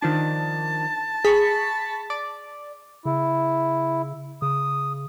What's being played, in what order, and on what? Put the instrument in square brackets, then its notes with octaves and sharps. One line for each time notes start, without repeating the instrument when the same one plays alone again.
[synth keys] D#3 F3 D4 [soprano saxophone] A5
[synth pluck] G#4 [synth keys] B5 C#6 B6
[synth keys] D5
[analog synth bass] C#3 [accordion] E4
[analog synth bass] C#3 [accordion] D#6